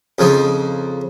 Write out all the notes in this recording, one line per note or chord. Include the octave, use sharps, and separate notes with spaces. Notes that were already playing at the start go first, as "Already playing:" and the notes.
F2 C#3 F3 D#4